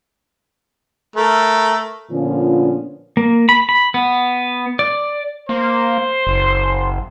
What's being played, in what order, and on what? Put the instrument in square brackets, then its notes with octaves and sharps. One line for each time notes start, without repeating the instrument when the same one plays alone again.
[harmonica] A3 A#4
[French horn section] A#2 D3 F3 B3 C#4 F4
[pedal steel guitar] A#3
B5
B5
B3
D5
[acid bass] A#3 [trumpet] C5
[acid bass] F#1